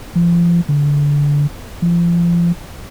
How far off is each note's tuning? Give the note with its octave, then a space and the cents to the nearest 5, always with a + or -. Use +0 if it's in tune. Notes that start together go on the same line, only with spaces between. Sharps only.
F3 -30
D3 -20
F3 -30